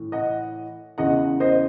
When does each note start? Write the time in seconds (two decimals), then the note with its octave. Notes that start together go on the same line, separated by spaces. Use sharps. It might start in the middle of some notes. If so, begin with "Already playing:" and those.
Already playing: A2 E3
0.12 D#5 F#5
0.98 E2 C#3 E3 D#5 F#5
1.40 C5 D#5